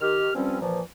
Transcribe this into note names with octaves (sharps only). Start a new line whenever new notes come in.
D#3 G4 F6
G2 F3 G3 C4 C#4
A#2 E3 F3